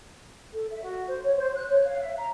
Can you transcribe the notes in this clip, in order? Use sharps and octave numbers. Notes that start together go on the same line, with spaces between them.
A4
E5
F#4
C5
C#5
C5
F#6
C#5
F5
E5
A#5